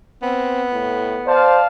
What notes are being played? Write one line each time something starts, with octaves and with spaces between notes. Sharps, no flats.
B3 C4
A2
C5 D5 F5 A5